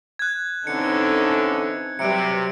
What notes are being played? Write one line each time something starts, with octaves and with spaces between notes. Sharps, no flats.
F#6 G#6
D3 E3 C4 C#4 D#4 A4 C#7
C3 F#3 G3 B4 C#7 D7